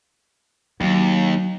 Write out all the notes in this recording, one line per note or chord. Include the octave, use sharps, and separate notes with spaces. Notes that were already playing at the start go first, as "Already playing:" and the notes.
D#2 F#3